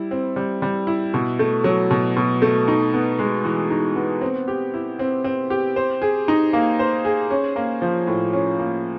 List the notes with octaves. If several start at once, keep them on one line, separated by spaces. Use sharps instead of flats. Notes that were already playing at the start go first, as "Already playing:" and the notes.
Already playing: G3 E4
C4
G3
G3
E4
B2
A3
F#3
B2
B2
A3
D#4
B3
G#3
E3
D#4
B3
C4
G4
E4
C4
C4
G4
C5
G#4
D#4
A#3
C5
G#4
C#4
A#3
F3
A2
C#4
A#3